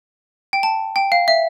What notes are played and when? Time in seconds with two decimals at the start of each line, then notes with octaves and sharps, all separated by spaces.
0.53 G5
0.63 A5
0.96 G5
1.12 F5
1.28 E5